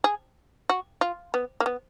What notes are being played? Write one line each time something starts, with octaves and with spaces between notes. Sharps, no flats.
G#4
F#4
F4
B3
A#3
B3